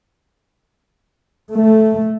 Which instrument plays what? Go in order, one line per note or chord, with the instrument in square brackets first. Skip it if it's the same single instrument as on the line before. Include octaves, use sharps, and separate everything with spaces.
[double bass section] A3